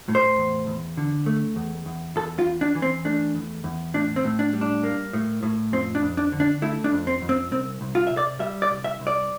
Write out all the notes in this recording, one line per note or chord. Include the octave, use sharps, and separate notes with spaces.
A2
C5
E2
E2
D3
A3
E2
E2
E2 A4
F4
E2
D4
E3
C4
A3 D4
E2
E2
A2 D4
C4
A2
D4
G3
D4
A#3
A2
A2
F2 C4
D4
F2
D4
D3
D4
A3 E4
D4
F2
C4
F2
C4
C2 C4
C2
F4
C3 E5
D5
G3 E5
D5
C2
E5
C2
D5